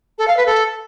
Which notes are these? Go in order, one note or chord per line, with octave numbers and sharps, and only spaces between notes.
A4
F5
B4
A4